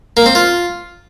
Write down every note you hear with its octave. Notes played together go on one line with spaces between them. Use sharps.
A#3
C4
F4